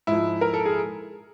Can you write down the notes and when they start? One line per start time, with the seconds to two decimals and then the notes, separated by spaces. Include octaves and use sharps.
0.07 G#2 F3 E4
0.41 A#4
0.54 A4
0.66 G#4